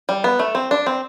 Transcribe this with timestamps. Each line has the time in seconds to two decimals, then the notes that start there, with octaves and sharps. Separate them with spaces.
0.09 G3
0.24 B3
0.39 A3
0.55 C4
0.71 D4
0.86 C4